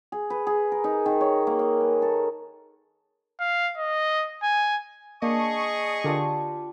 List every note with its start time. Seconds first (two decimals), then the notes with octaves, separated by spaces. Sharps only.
0.12 G#4
0.30 B4
0.47 G#4
0.72 A#4
0.84 D#4
1.06 D#3
1.21 C#5
1.47 A#3
1.59 F5
1.80 B4
2.02 A4
3.40 F5
3.77 D#5
4.43 G#5
5.22 A#3 D4 G#4 D#5 C#6
6.04 D3 D4 F4 G4 A#4 A5